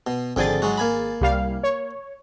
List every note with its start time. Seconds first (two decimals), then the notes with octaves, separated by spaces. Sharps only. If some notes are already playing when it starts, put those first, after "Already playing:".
0.07 B2
0.36 G#1 F2 D3 G#4 G5 A6
0.62 F#3 G#3 F#4
0.77 A#3 G#5 B5
1.21 C2 G3 F5
1.63 C#5